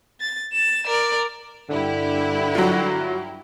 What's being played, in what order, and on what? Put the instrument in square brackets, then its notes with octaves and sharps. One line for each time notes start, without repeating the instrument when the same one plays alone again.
[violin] A6
A6 E7
A#4 D5
[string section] G2 E4 G4 [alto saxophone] D3
[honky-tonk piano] F#3 F4 [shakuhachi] F#4